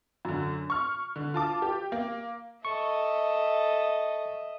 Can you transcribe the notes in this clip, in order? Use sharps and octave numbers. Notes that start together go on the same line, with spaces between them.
F#2 D3
C#6 F6
D3
F4 A5 D6
G4
A#3
A4 D#5 E5 C#6